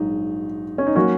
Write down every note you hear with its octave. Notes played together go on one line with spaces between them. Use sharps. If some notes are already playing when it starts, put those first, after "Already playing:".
Already playing: A#1 G#2 F#3 D#4
C#4
D#4
F#3 A#3 C#4 F#4